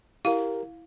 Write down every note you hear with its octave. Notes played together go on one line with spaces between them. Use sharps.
E4 G4 A#4 F5